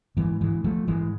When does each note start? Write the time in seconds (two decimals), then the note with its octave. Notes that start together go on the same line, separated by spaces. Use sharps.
0.17 G#2 E3
0.41 E3 G#3
0.64 F3 A3
0.87 G#2 E3 G#3